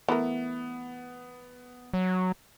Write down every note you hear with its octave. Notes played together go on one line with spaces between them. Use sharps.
E3 A3 B3 A#4
F#3